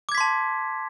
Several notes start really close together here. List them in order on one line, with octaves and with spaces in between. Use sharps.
D6 G#6 B6 C6 A5